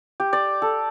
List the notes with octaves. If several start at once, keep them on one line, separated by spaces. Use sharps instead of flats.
G4
D5
A4